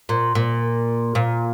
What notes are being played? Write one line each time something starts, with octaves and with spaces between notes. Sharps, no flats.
A#2
A#2
A#2